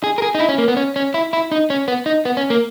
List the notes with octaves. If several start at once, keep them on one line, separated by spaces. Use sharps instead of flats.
G#4
A#4
G#4
D#4
E4
C#4
A#3
B3
C#4
C#4
E4
E4
D#4
C#4
B3
D#4
B3
C#4
A#3